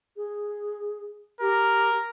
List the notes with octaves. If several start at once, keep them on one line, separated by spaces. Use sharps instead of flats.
G#4
G4 A#4